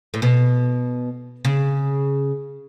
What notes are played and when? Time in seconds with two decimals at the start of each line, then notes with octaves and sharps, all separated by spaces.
0.14 A2
0.22 B2
1.45 C#3